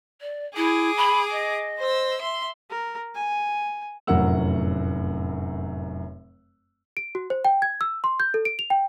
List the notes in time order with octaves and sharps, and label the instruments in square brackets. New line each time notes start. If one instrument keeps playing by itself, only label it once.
[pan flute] D5
[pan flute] E4 [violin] G#4 D6
[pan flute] B5
D#5
[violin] C5 E6
E5 C6
[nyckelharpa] A#4
G#5
[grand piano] F1 F#2 A2 A#4 F#5 E6
[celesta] D7
F#4
C5
G5
G#6
E6
C6
G6
A4
D7
F7
G5